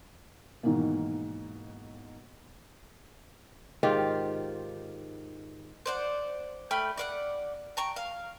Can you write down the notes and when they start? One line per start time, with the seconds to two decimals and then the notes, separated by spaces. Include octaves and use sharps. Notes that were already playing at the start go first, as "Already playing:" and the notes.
0.63 G#2 B2 D#3 E3 A#3
3.83 G#2 D#3 F4 G4
5.86 C5 D5 F#5
6.71 A3 G5 B5 F6
6.97 D5 F5 F#5
7.77 G5 A#5 C#6
7.96 F5